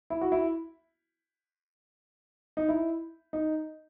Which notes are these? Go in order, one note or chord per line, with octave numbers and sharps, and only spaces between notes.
E4
F#4
E4
D#4
E4
D#4